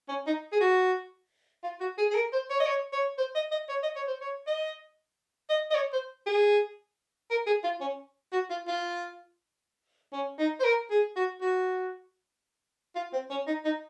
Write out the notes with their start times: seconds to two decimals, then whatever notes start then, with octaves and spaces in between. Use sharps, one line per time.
0.09 C#4
0.27 D#4
0.52 G#4
0.61 F#4
1.64 F4
1.80 F#4
1.98 G#4
2.11 G#4
2.15 A#4
2.33 C5
2.50 C#5
2.60 D#5
2.66 C#5
2.93 C#5
3.18 C5
3.35 D#5
3.52 D#5
3.69 C#5
3.83 D#5
3.96 C#5
4.08 C5
4.21 C#5
4.47 D#5
5.49 D#5
5.71 D#5
5.75 C#5
5.93 C5
6.26 G#4
7.30 A#4
7.47 G#4
7.64 F4
7.81 C#4
8.33 F#4
8.50 F4
8.68 F4
10.13 C#4
10.39 D#4
10.60 C5
10.64 A#4
10.91 G#4
11.16 F#4
11.41 F#4
12.95 F4
13.13 C4
13.30 C#4
13.47 D#4
13.65 D#4